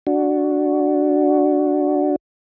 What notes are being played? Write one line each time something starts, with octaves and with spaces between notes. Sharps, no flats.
D4 F#4